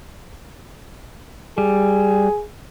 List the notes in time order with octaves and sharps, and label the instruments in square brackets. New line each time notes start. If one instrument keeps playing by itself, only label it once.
[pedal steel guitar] G3 [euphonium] G#4